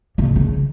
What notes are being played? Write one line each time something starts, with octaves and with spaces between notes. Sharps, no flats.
C#3
C#3